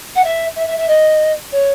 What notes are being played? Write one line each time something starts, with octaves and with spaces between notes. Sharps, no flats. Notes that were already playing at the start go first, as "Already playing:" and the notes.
F#5
E5
E5
E5
E5
D#5
C#5